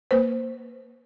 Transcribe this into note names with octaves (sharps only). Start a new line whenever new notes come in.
A#3 B4 C5